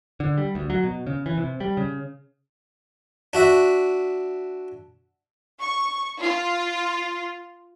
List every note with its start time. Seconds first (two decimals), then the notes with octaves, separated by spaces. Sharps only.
0.20 D3
0.38 G3
0.55 D2
0.70 F#3
0.84 B2
1.07 C#3
1.26 E3
1.38 C3
1.60 G3
1.77 C#3
3.33 D4 F#4 E5
5.60 C#6
6.21 F4